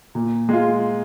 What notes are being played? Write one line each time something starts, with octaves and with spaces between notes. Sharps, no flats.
A#2
G#3 F4